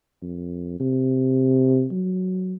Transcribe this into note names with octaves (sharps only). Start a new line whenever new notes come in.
F2
C3
F#3